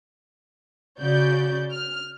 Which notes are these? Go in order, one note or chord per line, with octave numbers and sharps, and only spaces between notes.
C#3 F#4 D5 G6
F6